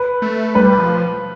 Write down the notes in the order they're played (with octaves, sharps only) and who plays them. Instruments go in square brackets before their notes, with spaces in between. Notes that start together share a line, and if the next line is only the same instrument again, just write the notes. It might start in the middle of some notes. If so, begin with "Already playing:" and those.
Already playing: [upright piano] B4
[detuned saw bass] A3
[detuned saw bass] G3 [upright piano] B4
[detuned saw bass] F3